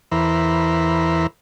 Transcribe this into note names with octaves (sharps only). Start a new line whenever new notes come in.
E2 E3 A#4 C5 B5